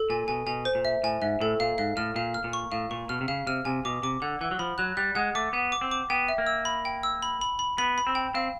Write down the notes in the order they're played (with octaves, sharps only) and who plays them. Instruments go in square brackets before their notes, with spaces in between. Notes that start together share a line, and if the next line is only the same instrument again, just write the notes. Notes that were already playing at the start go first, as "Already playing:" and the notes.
Already playing: [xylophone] A4
[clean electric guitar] A#2 [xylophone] G#5
[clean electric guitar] B2 [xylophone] G#5
[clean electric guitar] B2 [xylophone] G#5
[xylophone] C5
[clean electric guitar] A#2
[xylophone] E5
[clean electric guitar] A2 [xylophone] G#5
[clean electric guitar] G#2 [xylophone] E5
[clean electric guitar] A2 [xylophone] A4
[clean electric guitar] A#2 [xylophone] F5
[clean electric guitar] G#2 [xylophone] F5
[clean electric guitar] A2 [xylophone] F6
[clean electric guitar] A#2 [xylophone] F5
[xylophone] F6
[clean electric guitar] A#2
[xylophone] C#6
[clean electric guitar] A2 [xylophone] F5
[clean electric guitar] A#2 [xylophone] C#6
[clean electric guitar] B2 [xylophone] F6
[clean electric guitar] C3
[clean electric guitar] C#3 [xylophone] F5
[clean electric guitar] C3 [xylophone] F6
[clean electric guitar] C3 [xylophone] G#5
[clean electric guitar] B2 [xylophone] D6
[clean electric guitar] C3 [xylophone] D6
[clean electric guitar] D3 [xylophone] F#5
[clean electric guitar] E3 [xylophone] F#5
[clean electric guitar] F#3
[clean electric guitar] F3 [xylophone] B5
[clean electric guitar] F#3 [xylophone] F#6
[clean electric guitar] G3 [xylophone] F#6
[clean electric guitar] G#3 [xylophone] F#5
[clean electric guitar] A3 [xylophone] D6
[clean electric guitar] B3 [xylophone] F#5
[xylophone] D6
[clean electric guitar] C4
[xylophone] D6
[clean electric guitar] B3 [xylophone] G5
[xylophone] E5
[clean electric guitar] A#3
[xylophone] E6
B5
G5
E6
B5
B5
B5
[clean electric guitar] B3 [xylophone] B5
[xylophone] B5
[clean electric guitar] C4
[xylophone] G5
[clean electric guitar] C4 [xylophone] F5